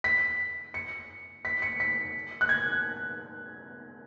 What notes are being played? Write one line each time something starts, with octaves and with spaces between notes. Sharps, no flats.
B6
C#7
B6
C#7
B6
F#6
G#6